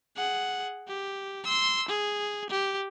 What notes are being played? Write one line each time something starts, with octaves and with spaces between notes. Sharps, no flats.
G#4 F#5
G4
C6 E6
G#4
G4